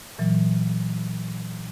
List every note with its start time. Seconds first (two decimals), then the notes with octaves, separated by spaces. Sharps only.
0.19 A#2 E3 F#3